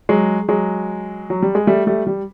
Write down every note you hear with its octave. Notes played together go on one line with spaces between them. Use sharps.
F#3 G#3
F#3 G#3
F#3
G3
G#3
G3 A3
G3 A3
G3